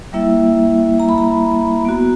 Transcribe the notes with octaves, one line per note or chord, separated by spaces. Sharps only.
G3 A#3 E4 E5
A#5
B5
A#5
B3 F#4